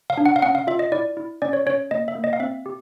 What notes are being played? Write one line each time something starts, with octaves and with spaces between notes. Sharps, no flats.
F5
D4
F#5
F5
C#4 F#5
F5
F4 E5
D#5
E4 D5
E4
C#4 D5
C#5
C#4 C#5
A#3 D#5
E5
A#3
D#5
F5
C4 E5
G4